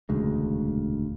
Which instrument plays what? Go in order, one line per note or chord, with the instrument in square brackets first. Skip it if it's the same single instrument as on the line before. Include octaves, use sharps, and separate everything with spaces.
[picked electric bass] E1 D2 C#3 G#3